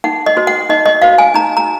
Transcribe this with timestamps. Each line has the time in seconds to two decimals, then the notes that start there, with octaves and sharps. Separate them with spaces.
0.04 D#4 F#5
0.26 D#5
0.37 F#4 C5
0.47 F#5
0.70 D#4 D#5
0.85 D#5
1.02 F#4 C5 F5
1.18 G#5
1.34 D#4 A#5
1.57 A#5